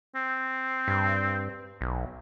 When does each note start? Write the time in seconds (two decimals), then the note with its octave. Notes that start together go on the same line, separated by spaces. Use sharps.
0.15 C4
0.88 G2
1.81 B1